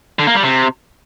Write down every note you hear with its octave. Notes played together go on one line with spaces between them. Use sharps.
D3
A#3
G3
C3